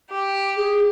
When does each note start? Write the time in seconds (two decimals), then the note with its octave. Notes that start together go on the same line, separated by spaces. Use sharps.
0.11 G4
0.57 G#4